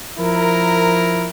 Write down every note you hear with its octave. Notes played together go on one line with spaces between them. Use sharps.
F3 E4 A#4